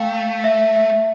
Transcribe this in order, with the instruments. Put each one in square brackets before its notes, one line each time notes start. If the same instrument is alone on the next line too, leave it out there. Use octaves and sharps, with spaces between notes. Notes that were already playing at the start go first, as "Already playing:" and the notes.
Already playing: [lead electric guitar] A3 [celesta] F5 G5
[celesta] E5
E5